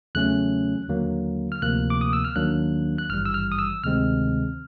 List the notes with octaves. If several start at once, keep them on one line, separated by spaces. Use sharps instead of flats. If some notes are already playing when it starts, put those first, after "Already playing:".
E2 C#3 F#3 A3 C#4 F#6
D#2 D3 F#3 A#3
F6
D2 C3 F3 A#3 F#6
D6
D#6
E6
F6
D#2 D#3 F#3 A#3 D4 F#6
F#6
G#1 G2 E3 G3 F6
E6
F6
D#6
E6
D2 C3 D#3 G#3 C4 F6